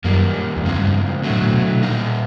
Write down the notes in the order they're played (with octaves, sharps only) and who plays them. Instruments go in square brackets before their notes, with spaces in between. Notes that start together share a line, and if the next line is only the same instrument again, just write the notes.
[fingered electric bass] F#2 [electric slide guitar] D#3 G3 A#3
[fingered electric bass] E2
[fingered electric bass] F2 [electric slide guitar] C#3 F3 G#3 C4
[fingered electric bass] G2
[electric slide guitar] D3 F#3 A3
[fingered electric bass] A2
A#2
B2
[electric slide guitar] A#2 G3 A#3 D#4